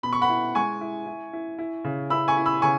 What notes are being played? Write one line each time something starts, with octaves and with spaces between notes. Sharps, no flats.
B2 B5
C#6
F#5 B5
E4
G#3 G#5 C#6
E4
E4
E4
E4
C#3
E4 B5 E6
G#5 C#6
E4
B5 E6
C#3 G#5 C#6